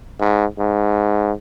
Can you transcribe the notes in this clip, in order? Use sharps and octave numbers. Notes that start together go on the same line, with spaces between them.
G#2
G#2